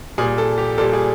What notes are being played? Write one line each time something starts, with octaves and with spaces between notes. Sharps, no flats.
A#2 G3 G#4
A4
G4
A#2 G3 A4
G#4